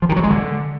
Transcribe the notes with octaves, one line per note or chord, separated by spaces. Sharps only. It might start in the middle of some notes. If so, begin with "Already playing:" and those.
F3
D#3
F#3
G#3
D3